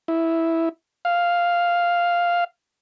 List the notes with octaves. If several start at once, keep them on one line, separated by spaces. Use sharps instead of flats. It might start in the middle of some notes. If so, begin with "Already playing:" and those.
E4
F5